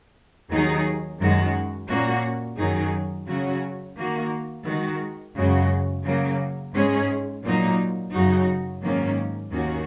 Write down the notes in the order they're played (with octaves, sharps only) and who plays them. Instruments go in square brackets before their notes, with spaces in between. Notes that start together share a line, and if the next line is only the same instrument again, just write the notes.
[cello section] D#2 D#3 F#3 D#4 G#4
F#2 D#3 G#3 F#4
A#2 A#3 C#4 F#4
F#2 D#3 F#3 D#4 G#4
C#3 F#3 C#4 F#4
D#3 A#3 F#4
D#3 G#3 F#4
F#2 C#3 G#3 F#4
C#3 F#3 A#3
G#2 G#3 C#4 G#4
A#2 F#3 A#3 D#4
F#2 C#3 F#3 D#4 F#4
G#2 D#3 F#3 A#3 C#4
D#2 D#3 A#3 C#4 F#4